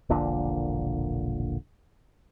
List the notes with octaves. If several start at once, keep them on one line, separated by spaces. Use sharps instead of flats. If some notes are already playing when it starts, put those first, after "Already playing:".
E1 A#1 A#2 D3